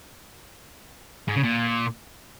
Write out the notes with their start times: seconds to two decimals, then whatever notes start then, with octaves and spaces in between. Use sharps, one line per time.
1.28 G#2
1.36 C#3
1.43 A#2